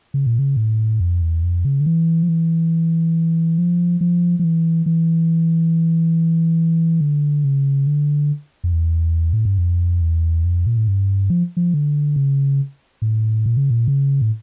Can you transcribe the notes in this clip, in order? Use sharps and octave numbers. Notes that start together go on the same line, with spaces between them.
C#3
A#2
C#3
A2
F2
E2
F2
C#3
D3
E3
F3
E3
F3
F3
F3
E3
E3
D3
C#3
D3
F2
E2
A2
G2
F2
E2
F2
A#2
A2
G2
F3
F3
D3
C#3
A2
A#2
C#3
A#2
C#3
A2